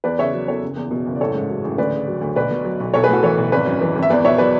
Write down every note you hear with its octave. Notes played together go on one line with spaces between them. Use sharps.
E2 B4 D5
C#3 C#5 E5
F#3
E2 A4 C#5
F#1
E2
B2
F#1
D5
A1 A4 C#5
G#2
F#3
A1
D2 B4 D5
C#3
F#3
D2
B1 B4 D5
B2
F#3
B1
B1 A4 C#5
G#4 B4
A2 F#4 A4
E3 A4 C#5
B1
G#1 B4 D5
F#2
E3
G#1
E5
E2 B4 D5
B2 C#5 E5
F#3 B4 D5